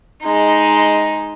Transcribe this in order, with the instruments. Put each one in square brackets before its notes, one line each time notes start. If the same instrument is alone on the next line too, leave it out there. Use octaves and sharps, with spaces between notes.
[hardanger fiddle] G#3 D#4